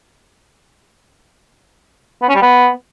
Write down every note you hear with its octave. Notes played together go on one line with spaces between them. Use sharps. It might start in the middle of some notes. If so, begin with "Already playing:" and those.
B3
C#4
G3
B3